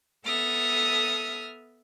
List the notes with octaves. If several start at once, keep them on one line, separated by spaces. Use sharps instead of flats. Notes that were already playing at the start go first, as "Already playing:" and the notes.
B3 A4 E5 D#6 F6